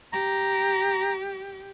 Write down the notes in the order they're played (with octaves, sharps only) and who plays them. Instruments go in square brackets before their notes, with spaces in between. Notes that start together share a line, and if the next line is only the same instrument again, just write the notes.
[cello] G4 [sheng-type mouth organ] A#5